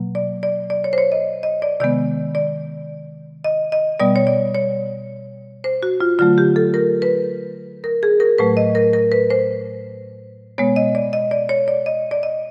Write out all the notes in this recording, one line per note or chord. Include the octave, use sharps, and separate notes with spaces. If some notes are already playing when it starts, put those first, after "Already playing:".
Already playing: B2 F#3 A#3
D5
D5
D5
C#5
C5
C#5
D#5
D#5
D5
C3 D#3 G#3 B3 D5
D5
D#5
D#5
B2 G3 B3 D5
C#5
D5
C#5
C5
F#4
F4
D3 F#3 A3 F4
G4
A4
A#4
B4
A#4
G#4
A#4
A2 F#3 A3 B4
D#5
A#4
A#4
B4
C5
B2 G#3 B3 C#5
D#5
D5
D#5
D5
C#5
D5
D#5
D5
D#5